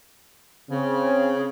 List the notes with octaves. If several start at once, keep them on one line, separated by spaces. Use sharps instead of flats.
C#3 C4